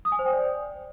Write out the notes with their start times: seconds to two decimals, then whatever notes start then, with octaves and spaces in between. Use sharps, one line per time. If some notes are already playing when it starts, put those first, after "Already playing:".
0.05 D#6
0.12 G#5
0.19 C5
0.26 G5
0.33 D5